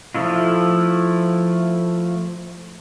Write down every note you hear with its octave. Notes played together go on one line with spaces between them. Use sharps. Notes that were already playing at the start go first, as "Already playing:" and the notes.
F3 A3 E4 F4